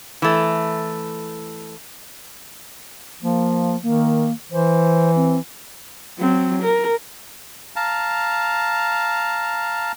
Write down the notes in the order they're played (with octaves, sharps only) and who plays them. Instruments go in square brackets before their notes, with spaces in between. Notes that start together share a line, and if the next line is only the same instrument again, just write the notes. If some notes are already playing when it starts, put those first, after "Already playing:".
[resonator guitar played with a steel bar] E3 A3
[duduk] F3 [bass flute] A#3
[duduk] D#3 [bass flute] A#3
[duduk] E3 [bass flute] C5
[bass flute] C4
[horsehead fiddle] F#3 C4
A#4
[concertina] F5 A5 A#5